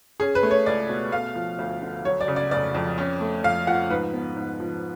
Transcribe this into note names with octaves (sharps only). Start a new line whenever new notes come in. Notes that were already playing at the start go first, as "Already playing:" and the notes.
C#4 G#4
B4
A3
C#5
C#2 D5
B2
A3 F5
F3
D2
D3
F#3 C#5
D5
C#3
D5
F1 D5
F2
C#4
A3
F2 F5
F3 F#5
G#2 B4
B3
G#2
F3